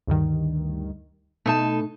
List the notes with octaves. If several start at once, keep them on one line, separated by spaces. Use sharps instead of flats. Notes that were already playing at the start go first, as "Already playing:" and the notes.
D2 G2 D#3
B2 A3 D#4 A5